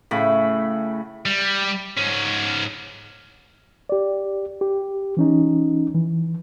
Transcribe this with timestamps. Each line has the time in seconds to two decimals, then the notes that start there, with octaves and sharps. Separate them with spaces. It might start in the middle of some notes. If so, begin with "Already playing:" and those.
0.11 A2 C#3 B5
1.26 G3
1.97 G#2 C#4
3.89 G4 D5
4.61 G4
5.17 E3 C#4 D#4
5.95 E3